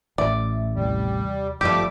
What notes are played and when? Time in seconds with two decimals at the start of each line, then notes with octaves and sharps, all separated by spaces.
0.18 A1 D5 E5
0.75 D#2 C3 E3 G3
1.61 G1 F3 G3 A3 G4 D6 E6